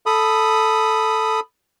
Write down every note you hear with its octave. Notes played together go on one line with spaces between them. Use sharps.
A4 B5 D#6